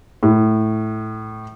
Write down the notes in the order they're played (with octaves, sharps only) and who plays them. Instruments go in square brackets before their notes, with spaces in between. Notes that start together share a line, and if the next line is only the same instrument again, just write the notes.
[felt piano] A2